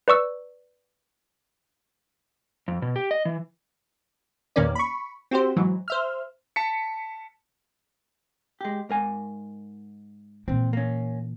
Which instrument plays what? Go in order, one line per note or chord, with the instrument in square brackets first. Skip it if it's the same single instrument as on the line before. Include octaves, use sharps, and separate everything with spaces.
[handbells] B4 D5 C#6 E6
[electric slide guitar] F2
B2
G4
D#5
E3
[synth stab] E2 A#2 D#3 A#3 C#4 D5
B5 C#6
C4 F#4 G4 C5
G#2 E3 F#3
C5 E5 F6
[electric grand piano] A5 B6 C#7
[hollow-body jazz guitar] G#3 G4
G#2 A#4 G#5
[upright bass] A#2 E3 [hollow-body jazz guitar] C4
[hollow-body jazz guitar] A#3 C#4